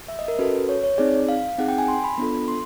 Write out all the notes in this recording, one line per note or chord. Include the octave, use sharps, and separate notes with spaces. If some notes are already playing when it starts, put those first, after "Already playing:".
E5
D#5
A#4
C#4 F#4 A4 B4
C#5
C#5
C4 D#4 G#4 D5
F5
C4 D#4 G#4 F#5
G5
G#5
C6
B5
B3 D4 F4 A4
C6